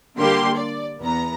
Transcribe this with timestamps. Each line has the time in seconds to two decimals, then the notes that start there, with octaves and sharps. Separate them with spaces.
0.17 D3 G3 A#3 G4 C6
0.55 D5
1.00 E2 B3 A#5